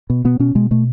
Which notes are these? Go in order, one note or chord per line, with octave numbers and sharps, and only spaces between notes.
B2
B2 B3
B2 C#4
B2 G#3
B2 A3